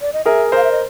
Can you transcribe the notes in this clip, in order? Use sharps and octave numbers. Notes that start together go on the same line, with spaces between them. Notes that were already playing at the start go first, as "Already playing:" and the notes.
D5
D#5
G#4 A#4 E5
A#4 C5 F5
E5
D#5